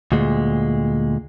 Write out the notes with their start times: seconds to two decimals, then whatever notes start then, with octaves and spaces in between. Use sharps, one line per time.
0.12 D2 A#2 G#3